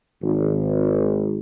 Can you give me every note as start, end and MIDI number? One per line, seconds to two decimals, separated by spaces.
0.23 1.40 32